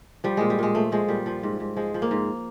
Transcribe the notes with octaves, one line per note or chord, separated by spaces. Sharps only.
F3 G3
A#2 G#3
G3
A#2 G#3
F3 A3
F3 G#3
A#2 G3
F3
G#2
G#2
F3 G#3
F3
A#3
G#2